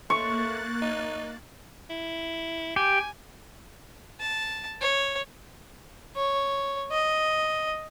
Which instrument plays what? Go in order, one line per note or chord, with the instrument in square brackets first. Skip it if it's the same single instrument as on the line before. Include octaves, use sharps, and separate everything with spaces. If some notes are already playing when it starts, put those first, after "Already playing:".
[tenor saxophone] A3 [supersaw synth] A#3 F#6 A6 [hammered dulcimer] C#6
[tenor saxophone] D#4
[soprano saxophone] E4
[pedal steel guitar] G4 [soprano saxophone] G#5
[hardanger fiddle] A5
C#5
[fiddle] C#5
D#5